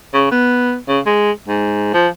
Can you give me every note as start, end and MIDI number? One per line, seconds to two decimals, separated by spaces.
0.14 0.27 49
0.32 0.76 59
0.88 1.00 49
1.06 1.31 56
1.48 1.93 44
1.94 2.08 53